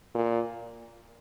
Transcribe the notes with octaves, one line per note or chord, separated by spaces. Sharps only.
A#2